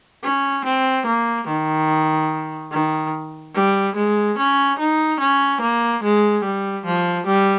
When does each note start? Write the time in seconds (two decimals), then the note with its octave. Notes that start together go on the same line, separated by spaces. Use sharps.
0.23 C#4
0.64 C4
1.06 A#3
1.47 D#3
2.71 D#3
3.54 G3
3.96 G#3
4.38 C#4
4.79 D#4
5.20 C#4
5.61 A#3
6.03 G#3
6.44 G3
6.85 F3
7.26 G3